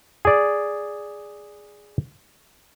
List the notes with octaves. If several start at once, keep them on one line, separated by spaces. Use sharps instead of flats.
G#4 D5